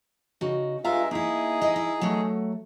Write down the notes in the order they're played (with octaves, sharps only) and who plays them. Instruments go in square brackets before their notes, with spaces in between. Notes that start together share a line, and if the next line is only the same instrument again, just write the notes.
[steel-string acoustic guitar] C#3 D#4 F#4
[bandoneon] G2 G#3 E5 [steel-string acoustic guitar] F4 F5 A#5
[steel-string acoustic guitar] A#3 E4 [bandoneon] D#4 G#4
[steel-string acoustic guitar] E4 D#5
E4
F#3 A3